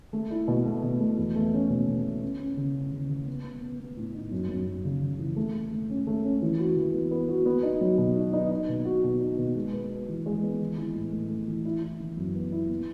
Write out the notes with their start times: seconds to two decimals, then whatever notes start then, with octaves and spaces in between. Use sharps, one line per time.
0.13 A3
0.30 E4
0.48 B2
0.66 A3
0.83 B2
1.00 A3
1.17 E2
1.36 A3
1.53 C#4
1.69 B2
1.87 B2
2.05 B2
2.22 C#4
2.39 C#4
2.57 C#3
2.75 C#4
2.92 C#3
3.09 C#3
3.27 B3
3.44 B3
3.62 B3
3.79 B3
3.97 A2
4.14 D#4
4.31 F#2
4.49 F#2
4.67 F#2
4.85 C#3
5.02 C#3
5.19 E3
5.36 A3
5.54 A3
5.71 A3
5.89 C#4
6.07 A3
6.24 C#4
6.42 E3
6.59 F#4
6.77 E3
6.94 B3
7.11 B3
7.28 F#4
7.46 B3
7.63 D#4
7.81 F#3
7.98 B2
8.16 D#4
8.33 D#4
8.51 D#4
8.69 B2
8.85 F#4
9.04 B2
9.20 D#4
9.38 B2
9.55 G#3
9.73 B3
9.90 B3
10.08 E3
10.26 G#3
10.43 B3
10.61 E3
10.77 E3
10.95 A2
11.13 A3
11.30 A3
11.48 E3
11.65 E4
11.82 E4
12.00 E3
12.17 F#2
12.35 B3
12.52 E4
12.69 B3